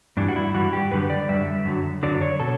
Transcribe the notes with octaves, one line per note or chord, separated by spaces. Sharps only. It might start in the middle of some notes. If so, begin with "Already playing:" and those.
G2 E3 G3 D4
F#4
E4
G2 E3 G3 F#4
G4
F#2 D3 G3 B4
D5
F#2 D3 G3 E5
F#2 D3 F#3
F#2 D3 F#3 D5
C#5
B2 A4